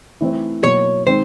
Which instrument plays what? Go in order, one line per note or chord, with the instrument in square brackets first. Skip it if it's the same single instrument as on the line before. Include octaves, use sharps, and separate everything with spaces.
[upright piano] E3 A3 C4
[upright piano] B2 F#3 A#3 [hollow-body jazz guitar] C#5
[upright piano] D#3 G#3 C4 [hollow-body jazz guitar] C5